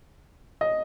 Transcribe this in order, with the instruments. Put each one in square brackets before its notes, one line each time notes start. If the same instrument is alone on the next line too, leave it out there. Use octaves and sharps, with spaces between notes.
[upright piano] D#5